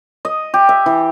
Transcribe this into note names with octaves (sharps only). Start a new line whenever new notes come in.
D#5
G4
E5
E3